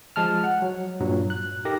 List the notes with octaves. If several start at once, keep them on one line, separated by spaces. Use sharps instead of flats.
F3 G#3 A5 F6
F#5
F#3
G2 A#2 F#3
F#6
D#4 G4 A4 A#4 A#6